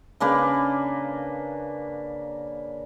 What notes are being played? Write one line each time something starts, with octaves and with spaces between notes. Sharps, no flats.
C#3 A#3 D4 B4